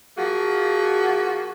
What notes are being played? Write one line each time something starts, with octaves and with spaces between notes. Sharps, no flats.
F3 A#3 F#4 G#4